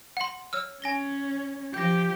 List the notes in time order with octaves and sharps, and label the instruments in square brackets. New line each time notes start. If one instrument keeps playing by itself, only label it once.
[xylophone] F#5 C6
C#5 E6 F6
[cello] C#4 [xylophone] G#5 A#6 G7
[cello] F3 G4 [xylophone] G6 A#6